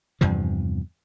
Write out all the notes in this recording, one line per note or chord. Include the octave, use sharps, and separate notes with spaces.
E2 G2 C3 F3